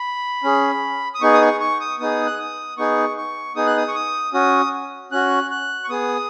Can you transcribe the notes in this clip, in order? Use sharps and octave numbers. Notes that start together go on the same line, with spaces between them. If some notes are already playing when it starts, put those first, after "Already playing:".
Already playing: B5
C#4 G#4
D#6
B3 D#4 G#4 C#6
D#6
C#6
C#6
D#6
B3 D#4 G#4 D#6
F#6
D#6
B3 D#4 G#4 C#6
C#6
B3 D#4 G#4 D#6
F#6
D#6
C#6
D#6
C#4 F#4 D#6
C#4 F#4 F#6
F#6
C#6
B3 G#4 D#6